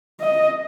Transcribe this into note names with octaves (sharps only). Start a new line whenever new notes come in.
D#5